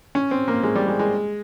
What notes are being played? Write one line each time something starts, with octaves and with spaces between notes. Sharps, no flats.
C#4
C4
A#3
G#3
G3
G#3
G#3